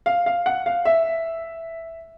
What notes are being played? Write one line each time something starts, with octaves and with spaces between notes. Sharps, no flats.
F5
F5
F#5
F5
E5